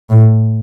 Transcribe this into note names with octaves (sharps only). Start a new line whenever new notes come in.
A2